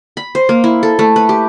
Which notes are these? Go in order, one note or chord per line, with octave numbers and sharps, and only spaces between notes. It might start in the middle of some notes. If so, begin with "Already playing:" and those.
B5
C5
A#3
E4
A4
A3
B4
G4